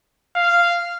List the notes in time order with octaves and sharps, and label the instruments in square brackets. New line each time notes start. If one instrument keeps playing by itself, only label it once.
[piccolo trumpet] F5